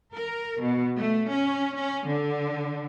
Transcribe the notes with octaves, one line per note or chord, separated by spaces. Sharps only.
A#4
B2
A3
C#4
C#4
D3